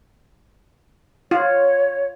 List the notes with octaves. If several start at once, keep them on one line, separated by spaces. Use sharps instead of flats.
F4 C#5